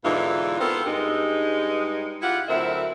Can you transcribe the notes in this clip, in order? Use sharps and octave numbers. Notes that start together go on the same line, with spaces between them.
G#2 B2 D3 E3 D#4 F4
B3 C4 F4 A4 A#4 C5
G2 G#3 D#4
E4 F4 G4 F#5
D2 F#3 C4 E4 A#4 E5